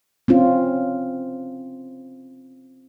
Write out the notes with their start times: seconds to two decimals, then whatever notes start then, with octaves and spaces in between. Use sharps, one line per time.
0.28 C4 C#4 F4